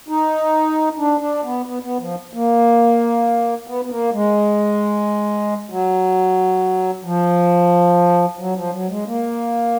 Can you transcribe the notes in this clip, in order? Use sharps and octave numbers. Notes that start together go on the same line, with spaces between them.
D#4
D4
D4
B3
B3
B3
F3
A#3
B3
B3
A#3
G#3
F#3
F3
F#3
F3
F#3
G#3
A#3